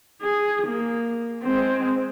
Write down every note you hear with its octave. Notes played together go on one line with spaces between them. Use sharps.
G#4
A#3
G#3 C4